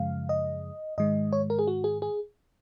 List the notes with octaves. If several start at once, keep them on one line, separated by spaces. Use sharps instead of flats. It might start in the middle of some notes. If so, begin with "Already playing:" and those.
Already playing: F#2 C#3 F3 G#3 F5
D#5
G#2 D#3 G#3 D#5
C#5
A#4
G#4
F#4
G#4
G#4